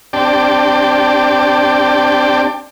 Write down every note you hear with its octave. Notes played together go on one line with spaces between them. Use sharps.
C4 D4 G4 D5 G5 A5